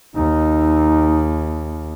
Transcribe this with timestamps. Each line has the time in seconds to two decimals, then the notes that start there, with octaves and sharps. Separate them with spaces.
0.16 D#2 D#4